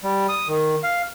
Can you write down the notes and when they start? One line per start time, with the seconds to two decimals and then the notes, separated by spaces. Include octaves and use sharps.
0.04 G3
0.29 D#6
0.48 D#3
0.83 F5